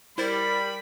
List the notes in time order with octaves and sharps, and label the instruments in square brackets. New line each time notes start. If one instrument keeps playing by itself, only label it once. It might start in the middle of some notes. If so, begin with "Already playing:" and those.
[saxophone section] G3 [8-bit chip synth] E4 C5 A6 [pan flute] A#4 [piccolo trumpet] B5